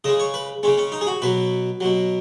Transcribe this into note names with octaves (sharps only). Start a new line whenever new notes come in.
C#3 G#3 D#5
C#5
B4
C#3 G#3 C#4
C#4
D#4
G#4
F#4
B2 F#3 B4
B2 F#3